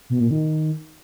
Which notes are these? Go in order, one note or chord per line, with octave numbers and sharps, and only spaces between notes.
B2
A#2
D#3